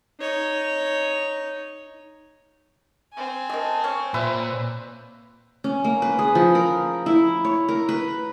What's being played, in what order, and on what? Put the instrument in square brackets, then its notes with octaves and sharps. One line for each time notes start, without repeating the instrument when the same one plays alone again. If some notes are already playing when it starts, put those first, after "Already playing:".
[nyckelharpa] D#4 C#5
[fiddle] C4 G#5
[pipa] A3 A#3 [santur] D#5
[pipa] C#4
[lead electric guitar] A#2 [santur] B4 C5 E5
[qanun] C#4
A#3
B4
G#4
F3
A#4
E4
C#5
A#4
B4